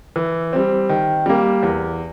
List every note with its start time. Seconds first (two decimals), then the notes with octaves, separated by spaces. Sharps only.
0.16 E3
0.53 G3 C4
0.89 D#3
1.26 G3 A#3
1.63 E2